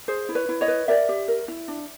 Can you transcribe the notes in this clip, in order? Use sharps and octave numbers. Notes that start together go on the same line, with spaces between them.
G#4 C5
E4
B4 C#5
E4
C#5 D#5
B4
A#4 D5 E5
G4
A#4
E4
D4